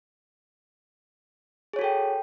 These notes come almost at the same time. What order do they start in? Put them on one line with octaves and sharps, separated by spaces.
G#4 C#5 F#4 A4 G5